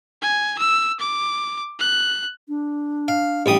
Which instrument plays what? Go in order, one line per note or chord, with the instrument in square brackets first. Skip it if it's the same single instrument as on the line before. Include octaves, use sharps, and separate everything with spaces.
[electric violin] G#5
E6
D6
F#6
[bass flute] D4
[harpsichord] F5
A1 G3 D#6